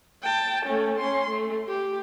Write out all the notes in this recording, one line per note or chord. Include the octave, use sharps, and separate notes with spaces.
G5 A5
A3 C#4
C#4 C6
A3
G4